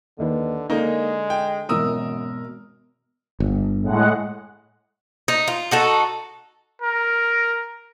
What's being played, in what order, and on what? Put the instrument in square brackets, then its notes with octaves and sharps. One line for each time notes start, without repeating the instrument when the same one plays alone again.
[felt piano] D#2 D#3 B4 [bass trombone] D3
[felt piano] D3 [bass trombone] G#3 [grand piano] A#3 D#4
[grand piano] G5
[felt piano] G#1 B2 E3 [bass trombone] F#2 [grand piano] A#4 D#6 E6
[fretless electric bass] G1
[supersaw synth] A2 G#3 F#5
[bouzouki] D#4
F4
D#4 F#4 A4
[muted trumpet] A#4